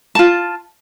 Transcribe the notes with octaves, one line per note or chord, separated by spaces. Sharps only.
F4 A5